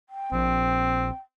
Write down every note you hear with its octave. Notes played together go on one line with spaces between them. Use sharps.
G5
A#1 C4